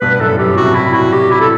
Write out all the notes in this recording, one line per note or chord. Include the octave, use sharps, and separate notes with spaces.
G2 B2 B4
B4
F#2 A2 A4
F#2 A2 G4
A2 C3 F#4
E4
F#4
G4
E4
A4